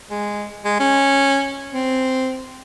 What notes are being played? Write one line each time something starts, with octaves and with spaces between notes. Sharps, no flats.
G#3
G#3
C#4
C4